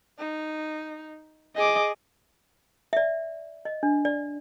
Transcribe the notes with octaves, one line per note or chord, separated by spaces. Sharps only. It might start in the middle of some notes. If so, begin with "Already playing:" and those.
D#4
G#4 D#5 D6
D5 E5
D#5
D4
D5